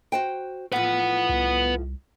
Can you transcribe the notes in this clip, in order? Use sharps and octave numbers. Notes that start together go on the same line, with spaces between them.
F#4 C5 G5
A2 E3 F3 B4 F#5
C2